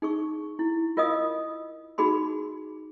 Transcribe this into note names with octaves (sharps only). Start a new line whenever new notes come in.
D#4 G#4 C#6
E4
F4 A#4 D#5 F5 D#6
D#4 F#4 G#4 B5 C6